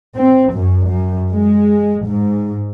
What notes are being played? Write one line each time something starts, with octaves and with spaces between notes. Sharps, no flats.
C4
F#2
F#2
G#3
G#2